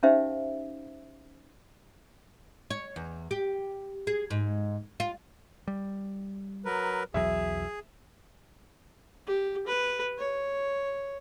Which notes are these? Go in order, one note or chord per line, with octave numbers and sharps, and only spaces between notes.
C#4 D#4 G4 C5 E5 F5
C#5
E2
G4
G#4
G#2
F4
G3
F#3 A#4 B4
B1 E2 F#3 G#4 E5
G4
B4
C#5